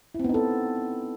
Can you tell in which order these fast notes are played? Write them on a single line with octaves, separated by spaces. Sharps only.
E4 C4 B3 D#4 A4